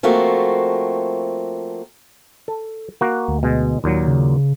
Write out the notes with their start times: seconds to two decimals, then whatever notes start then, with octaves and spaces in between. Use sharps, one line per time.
0.03 F3 A3 A#3 C4 F#4
2.48 A4
3.01 A#3 F#4
3.28 D2
3.43 B2 G#3
3.84 D#2 A#2 F#3
4.08 C#3